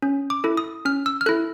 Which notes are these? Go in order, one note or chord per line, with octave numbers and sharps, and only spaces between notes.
C#4
D6
E4 A4
D#6
C#4 F6
E6
F6
E4 A4 F#6